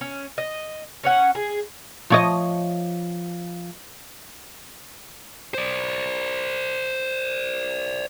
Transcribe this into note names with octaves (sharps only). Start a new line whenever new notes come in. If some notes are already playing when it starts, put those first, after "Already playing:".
C#4
D#5
C#4 C#5 F#5
G#4
F3 C#5 D#5
C5 D5